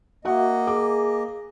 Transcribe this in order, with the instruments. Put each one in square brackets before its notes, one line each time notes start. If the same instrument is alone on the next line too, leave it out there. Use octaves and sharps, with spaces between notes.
[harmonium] A#3 D#5 [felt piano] F#4 E5 F#5
[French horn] G#4 [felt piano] D6